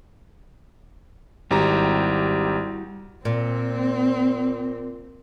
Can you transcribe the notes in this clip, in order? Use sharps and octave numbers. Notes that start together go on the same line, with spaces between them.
G#1 G3 E4 F#4 G4 A#5
A#2 C4